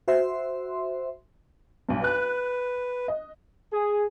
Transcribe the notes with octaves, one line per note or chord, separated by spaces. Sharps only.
F#4 C5 E5 C6
B1 G2
B4 F#6
D#5
G#4